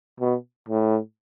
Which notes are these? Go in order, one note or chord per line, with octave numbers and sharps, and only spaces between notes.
B2
A2